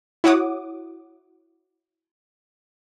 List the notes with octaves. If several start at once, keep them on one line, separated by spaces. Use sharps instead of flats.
E4 F#4 C#5 F#5 D6 D#6